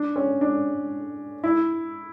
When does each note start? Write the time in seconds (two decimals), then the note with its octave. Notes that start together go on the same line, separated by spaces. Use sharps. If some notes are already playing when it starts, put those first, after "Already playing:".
Already playing: D4
0.16 C#4
0.41 D4
1.44 E4